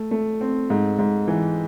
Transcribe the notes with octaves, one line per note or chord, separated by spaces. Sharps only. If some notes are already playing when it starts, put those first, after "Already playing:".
Already playing: A3
A3
C4
G#2
G#2
E3